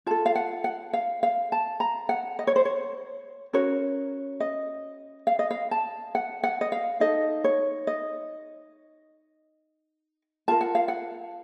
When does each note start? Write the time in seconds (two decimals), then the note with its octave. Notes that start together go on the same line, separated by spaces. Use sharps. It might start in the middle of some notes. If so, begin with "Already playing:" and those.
0.06 F4 A4 A5
0.26 F5
0.35 F#5
0.64 F#5
0.93 F5
1.23 F5
1.52 A5
1.80 A#5
2.09 F#5
2.39 D#5
2.47 C#5
2.56 C5
2.65 C#5
3.53 C#4 F#4 A#4 C#5
4.40 D#5
5.27 F5
5.39 D#5
5.51 F5
5.71 A5
6.15 F#5
6.43 F#5
6.61 D#5
6.72 F5
7.00 D#4 A4 D#5
7.44 C#5
7.87 D#5
10.48 F4 A#4 A5
10.61 F#5
10.75 F5
10.88 F#5